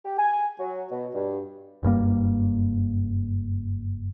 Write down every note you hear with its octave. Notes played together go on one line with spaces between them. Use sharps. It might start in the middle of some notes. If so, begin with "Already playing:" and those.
G4
G#5
F#3
B2
G2
F#1 G2 G3 A#3